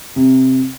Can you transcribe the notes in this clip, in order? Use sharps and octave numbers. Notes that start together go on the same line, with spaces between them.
C3